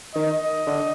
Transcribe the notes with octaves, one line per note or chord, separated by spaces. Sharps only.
D#3 D#5
D3